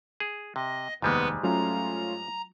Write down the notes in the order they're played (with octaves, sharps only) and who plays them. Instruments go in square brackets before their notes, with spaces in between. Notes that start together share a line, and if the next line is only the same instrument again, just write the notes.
[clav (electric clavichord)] G#4
[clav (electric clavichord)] C3 [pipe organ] D#5
[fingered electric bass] F1 D#2 [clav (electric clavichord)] G#2 G3 G#3 [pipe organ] B3 B4
[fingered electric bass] F#3 [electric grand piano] A3 C#4 F4 [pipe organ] A#5